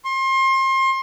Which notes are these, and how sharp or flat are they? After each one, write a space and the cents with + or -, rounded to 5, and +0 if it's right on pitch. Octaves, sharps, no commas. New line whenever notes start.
C6 +30